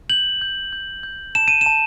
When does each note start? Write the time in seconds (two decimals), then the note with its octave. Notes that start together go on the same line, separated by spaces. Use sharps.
0.10 G6 F#7
0.41 G6
0.73 G6
1.03 G6
1.35 A5 E7
1.48 D#7
1.61 E7
1.66 A5